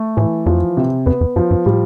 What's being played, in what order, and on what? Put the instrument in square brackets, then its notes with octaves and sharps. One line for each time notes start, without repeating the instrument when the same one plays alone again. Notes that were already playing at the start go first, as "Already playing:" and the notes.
Already playing: [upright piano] A3
[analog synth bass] A2 [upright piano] E3
[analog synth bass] F2 [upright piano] F3
[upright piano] C3
[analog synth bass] F2 [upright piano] B3
[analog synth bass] F2
[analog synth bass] G2 [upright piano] F3
[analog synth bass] G2
[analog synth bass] A2 [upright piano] G3